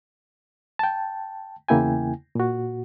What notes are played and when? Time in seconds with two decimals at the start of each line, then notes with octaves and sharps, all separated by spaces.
0.79 G5 A5
1.69 E2 C#3 A#3 E4 G5 G#5
2.35 A#2 F#4